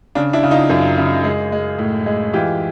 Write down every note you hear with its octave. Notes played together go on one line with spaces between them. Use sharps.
C#3 D4
D4 E4
C#3
D#4 F4
F#2
C#3
G#3
G#3
A2
G#3
E3 F4 G4